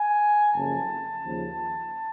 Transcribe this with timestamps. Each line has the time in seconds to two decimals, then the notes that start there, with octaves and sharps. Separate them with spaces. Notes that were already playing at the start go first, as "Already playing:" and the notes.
Already playing: G#5
0.53 F#1 F2 C#3 A5
1.22 D#2 C#3 F3